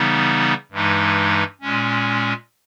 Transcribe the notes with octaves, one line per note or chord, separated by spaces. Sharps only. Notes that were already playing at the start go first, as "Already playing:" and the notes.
Already playing: C#3 E3 G3 B3 D#4
G2 E3 G#3 D#4
A#2 G#3 C#4